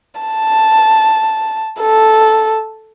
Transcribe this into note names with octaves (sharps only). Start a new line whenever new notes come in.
A5
A4